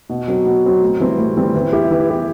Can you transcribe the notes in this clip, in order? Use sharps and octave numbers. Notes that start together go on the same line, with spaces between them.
B2
F#3 C4 F#4
B2
F#3 C4 F#4
A2
E3 G3 C4
A2
E3 G3 C4
E3
B3 E4 G4
E3
B3 E4 G4